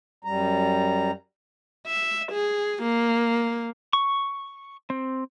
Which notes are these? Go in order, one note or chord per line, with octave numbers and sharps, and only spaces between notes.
F#2 G3 A#5
E5
G#4
A#3
C#6
C4